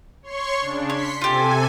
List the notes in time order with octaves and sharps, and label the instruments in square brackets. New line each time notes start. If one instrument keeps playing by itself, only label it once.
[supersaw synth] C#5 C6 C#6
C#3 D4
[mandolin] C#5 [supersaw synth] C6 B6 C#7
[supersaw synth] C3 A4 G#5 [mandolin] F4 G4